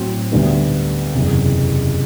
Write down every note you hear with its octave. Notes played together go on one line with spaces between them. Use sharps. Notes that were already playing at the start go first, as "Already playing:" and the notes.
Already playing: A2 F#3 C4 F#4
D2 D3 G3 B3
F#1 E2 C3